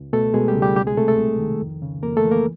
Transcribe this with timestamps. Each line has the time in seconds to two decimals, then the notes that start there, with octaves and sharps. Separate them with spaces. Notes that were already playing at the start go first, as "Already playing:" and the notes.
Already playing: C#2
0.13 B2 A3 A4
0.34 B2 G#3 G#4
0.48 G3 G4
0.55 C#2
0.62 G3 G4
0.76 C2 G3 G4
0.87 G#3 G#4
0.97 C3 A3 A4
1.08 A3 A4
1.18 C2
1.39 D#3
1.61 F2
1.82 C#3
2.03 F2 A#3 A#4
2.17 A3 A4
2.24 E3
2.31 A#3 A#4